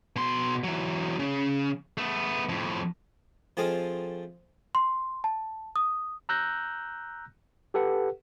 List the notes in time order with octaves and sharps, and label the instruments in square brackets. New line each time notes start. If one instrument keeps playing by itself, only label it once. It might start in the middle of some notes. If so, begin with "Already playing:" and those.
[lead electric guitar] B2 C6
E3 F#3
C#3
A3 B3
F2 A2
[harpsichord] F3 A3 C4 G#4 D#5 F5
[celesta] C6
A5
D#6
[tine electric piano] A#5 E6 F#6 G6 A#6
G4 A4 B4 F#5